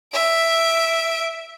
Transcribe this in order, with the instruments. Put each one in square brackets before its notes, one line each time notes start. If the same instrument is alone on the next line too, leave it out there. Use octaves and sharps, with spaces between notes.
[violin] E5 D7